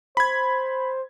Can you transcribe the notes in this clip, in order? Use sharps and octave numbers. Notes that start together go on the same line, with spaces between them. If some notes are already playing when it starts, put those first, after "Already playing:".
C5 B5 G#6